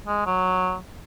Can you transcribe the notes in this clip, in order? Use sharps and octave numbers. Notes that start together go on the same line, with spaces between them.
G#3
F#3